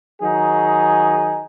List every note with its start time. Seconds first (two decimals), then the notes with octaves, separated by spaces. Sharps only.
0.21 D#3 F#3 D#4 G#4